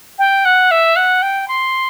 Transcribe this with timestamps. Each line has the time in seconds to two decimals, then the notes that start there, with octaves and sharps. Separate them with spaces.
0.18 G5
0.45 F#5
0.70 E5
0.95 F#5
1.22 G5
1.48 C6